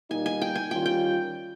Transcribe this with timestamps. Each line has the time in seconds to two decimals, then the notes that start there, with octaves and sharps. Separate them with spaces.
0.10 A#2 G3 A#3 D#4 G#5
0.26 G#5
0.41 G5
0.55 G#5
0.71 D#3 G3 C#4 F4 G5
0.86 G5